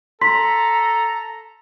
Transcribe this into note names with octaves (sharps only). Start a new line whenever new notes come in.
A4 A#5 C6 B6